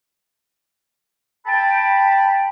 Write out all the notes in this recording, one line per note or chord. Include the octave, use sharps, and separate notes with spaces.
G5 A5 B5